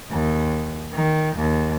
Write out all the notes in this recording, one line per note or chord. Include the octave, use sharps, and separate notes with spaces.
D#2
D#3
D#2